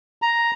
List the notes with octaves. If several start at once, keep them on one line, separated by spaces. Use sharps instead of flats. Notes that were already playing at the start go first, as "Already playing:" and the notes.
A#5